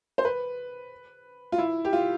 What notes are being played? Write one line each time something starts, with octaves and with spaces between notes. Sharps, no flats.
C5
B4
F4
E4
G4
F4